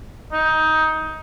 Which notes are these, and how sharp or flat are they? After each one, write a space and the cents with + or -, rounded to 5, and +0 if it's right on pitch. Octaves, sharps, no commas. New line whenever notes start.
D#4 +15